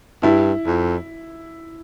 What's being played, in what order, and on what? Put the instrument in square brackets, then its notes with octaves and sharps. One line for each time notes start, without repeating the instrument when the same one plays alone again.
[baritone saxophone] G2 [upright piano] E4
[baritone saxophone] F2